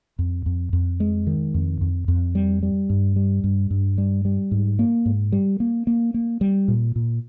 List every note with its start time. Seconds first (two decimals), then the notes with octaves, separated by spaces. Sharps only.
0.19 F2
0.46 F2
0.73 F2
1.00 G#3
1.27 D#3
1.54 F2
1.81 F2
2.08 F2
2.35 G3
2.63 G3
2.90 G2
3.16 G3
3.44 G2
3.70 G2
3.98 G3
4.25 G3
4.51 G#2
4.79 A#3
5.05 G#2
5.32 G3
5.60 A#3
5.87 A#3
6.14 A#3
6.41 G3
6.68 A#2
6.96 A#2